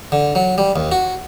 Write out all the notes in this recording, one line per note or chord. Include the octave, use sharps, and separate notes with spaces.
D3
F#3
G3
D#2
F#4